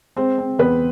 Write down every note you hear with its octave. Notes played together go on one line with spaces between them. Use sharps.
G#3 C4 C5
C4
E2 B3 B4